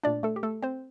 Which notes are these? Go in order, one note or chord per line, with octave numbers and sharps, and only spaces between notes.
A#2 A3 D4 D5
A3 A4
G4
A3 A4
C4 C5